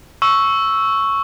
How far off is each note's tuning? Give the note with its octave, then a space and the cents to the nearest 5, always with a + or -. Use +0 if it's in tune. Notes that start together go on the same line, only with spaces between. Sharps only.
C#6 +0 E6 +0